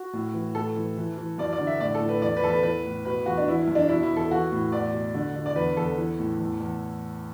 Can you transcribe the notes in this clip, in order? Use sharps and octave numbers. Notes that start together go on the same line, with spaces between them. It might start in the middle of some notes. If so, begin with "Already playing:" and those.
Already playing: F#4
A2
E3
A2 A4
E3
E3
E3
F#2 D5
D5
D3
E5
A2 D5
A4
A2
B4
E2 D5
B4
E2 A4
B4
E3 B4
A2
B2 B4
E2 F#4
D4
E3 E4
E4
F#2
D4
B2 E4
E4
E2
A4
E3 F#4
A2
E2 D5
B2
D3
D3
D5
E2 B4
E2 A4
E3
A2
E2
E2